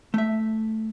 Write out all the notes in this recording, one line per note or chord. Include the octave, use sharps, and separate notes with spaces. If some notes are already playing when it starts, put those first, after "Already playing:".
A3 E5